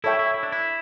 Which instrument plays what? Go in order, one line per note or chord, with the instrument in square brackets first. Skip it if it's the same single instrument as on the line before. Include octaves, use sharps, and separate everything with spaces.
[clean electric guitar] E4 [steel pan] A4 C#5 E5 G5
[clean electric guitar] E4
E4
D4
E4